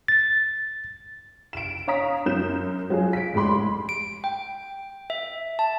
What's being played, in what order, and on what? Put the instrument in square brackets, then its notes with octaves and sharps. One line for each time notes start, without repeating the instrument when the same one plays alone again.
[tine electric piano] A6
[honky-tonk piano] D7 E7
C#5 F5 A#5 D#6 B6
F#2 G6 E7
F#3 F4 G#4
B6 D7
F1 A2 G#3 B5 C6
[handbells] D7
G5
E5
A5